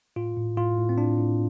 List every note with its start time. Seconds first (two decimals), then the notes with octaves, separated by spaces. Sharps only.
0.16 A2 F4
0.37 A2
0.57 A2 F4
0.78 A2
0.89 C4
0.98 A2 D4
1.18 A2